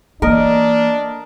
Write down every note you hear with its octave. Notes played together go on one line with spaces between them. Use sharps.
E3 A#3 D4 A#4 D#5